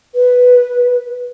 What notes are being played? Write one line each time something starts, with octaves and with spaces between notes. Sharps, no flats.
B4